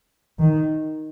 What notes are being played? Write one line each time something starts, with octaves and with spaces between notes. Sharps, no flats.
D#3